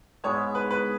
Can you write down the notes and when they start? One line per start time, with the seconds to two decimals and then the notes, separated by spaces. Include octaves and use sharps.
0.24 G#2 G#3 B3 C#5
0.55 B4
0.71 B4